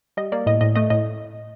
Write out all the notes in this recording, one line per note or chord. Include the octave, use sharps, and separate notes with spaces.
G3 D#5
A#3 D5
A2 D#5
A2 D#5
A3 D#5
A2 D#5